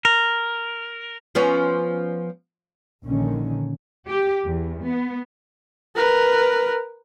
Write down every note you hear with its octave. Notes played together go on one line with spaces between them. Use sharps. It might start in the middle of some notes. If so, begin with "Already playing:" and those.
A#4
F3 B3 C#4
A#1 D3 D#3 C#4
G4
E2
B3
A#4 B4